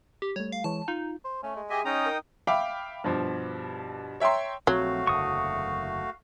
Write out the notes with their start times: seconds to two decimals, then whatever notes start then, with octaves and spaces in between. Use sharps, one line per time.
0.22 G4
0.36 G3 A3 C#5
0.52 F5
0.64 E3 G#3 C#5 A5
0.88 D#4 F4
1.25 C5
1.43 A3 C#4
1.56 G#3
1.70 G4 G#4 D#5 E5 G#5
1.85 C#4 D#4 G5 A#5 D#6
2.06 A#4
2.47 E5 F5 G5 B5 D6
3.04 G2 B2 F3
4.20 C#5 E5 G5 A#5 C6
4.67 A#1 F#3 A3 C4 F#4 F5
5.07 F#1 E2 D3 C#6 D#6